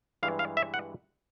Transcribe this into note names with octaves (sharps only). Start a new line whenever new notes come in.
G2 E3 G#3 F5
F5
E5
F#5